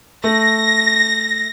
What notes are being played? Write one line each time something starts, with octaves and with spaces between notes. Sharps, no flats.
A3 A#6